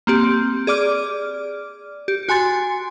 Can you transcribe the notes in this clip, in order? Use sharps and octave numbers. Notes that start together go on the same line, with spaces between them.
A#3 C4 G4
G#4 D5 D6 F6
G4
F#4 G#5 C6 A6